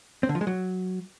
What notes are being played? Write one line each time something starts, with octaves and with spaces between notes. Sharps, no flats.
C4
D3
F3
G#3
F#3